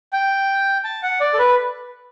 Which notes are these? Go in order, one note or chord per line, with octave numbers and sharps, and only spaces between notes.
G5
A5
F#5
D5
A4
B4